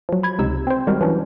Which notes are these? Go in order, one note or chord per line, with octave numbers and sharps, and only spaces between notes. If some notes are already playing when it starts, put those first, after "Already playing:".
F3 F#3
B5 G#6
C#2 C3 D#4 E6
C4 C5
D#3 G3 G#3 F#4 A#4
E3 F#3 C#4 D4